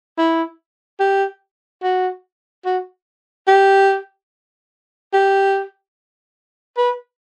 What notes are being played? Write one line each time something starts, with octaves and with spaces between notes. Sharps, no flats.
E4
G4
F#4
F#4
G4
G4
B4